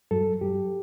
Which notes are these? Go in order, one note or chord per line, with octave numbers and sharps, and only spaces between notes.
G2 F#3 A4
G2 F#3 G4